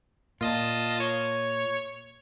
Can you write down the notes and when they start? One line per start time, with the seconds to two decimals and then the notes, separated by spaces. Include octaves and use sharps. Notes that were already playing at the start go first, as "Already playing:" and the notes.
0.41 A#2 F4 D#5 A5
1.00 C#5